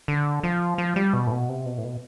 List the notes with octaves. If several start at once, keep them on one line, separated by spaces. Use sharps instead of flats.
D3
F3
F3
G3
B2
A2
B2
C3
B2
A2
B2